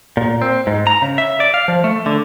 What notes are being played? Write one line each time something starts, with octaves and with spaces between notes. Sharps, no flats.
A#2
C4
G#2
A#5
C#3
E5
D5
F5
F3
A3
D3